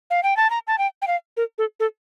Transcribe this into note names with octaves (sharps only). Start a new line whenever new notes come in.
F5
G5
A5
A#5
A5
G5
G5
F5
A#4
A4
A4